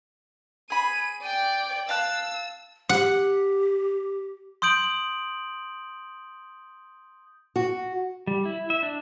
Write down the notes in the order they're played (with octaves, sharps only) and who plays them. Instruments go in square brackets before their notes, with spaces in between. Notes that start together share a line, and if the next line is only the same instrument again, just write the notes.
[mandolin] G#4 B5 [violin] D#7
[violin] D5 G5
[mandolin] F5 A5 F#6 [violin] E6
[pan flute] G4 [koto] F#5
[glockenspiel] C6 D#6 G6 D7 F#7
[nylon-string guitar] F#4
[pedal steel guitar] G3
E4
E5
D4